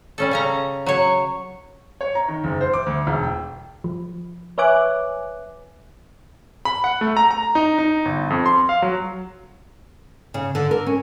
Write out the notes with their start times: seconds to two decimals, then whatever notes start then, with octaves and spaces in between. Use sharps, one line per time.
0.18 G3 C#4 A4
0.31 C#3 C#4 A#5
0.86 F#3 C#5
2.01 C#5
2.15 A#5
2.28 D#3
2.44 F#1
2.61 C5
2.73 D6
2.86 D2
3.07 E1
3.23 G5
3.84 F3
4.58 B4 C#5 E5 G#5 D6 F#6
6.65 B5
6.84 F#5
7.01 A3
7.17 A#5
7.31 A#5
7.55 D#4
7.79 D#4
8.05 G1
8.30 F2
8.46 C6
8.69 F5
8.82 F#3
10.34 C#3
10.55 D3
10.71 A#4
10.86 C#4